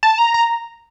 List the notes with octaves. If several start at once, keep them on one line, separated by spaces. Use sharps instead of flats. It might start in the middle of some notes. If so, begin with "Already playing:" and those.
A5
A#5
A#5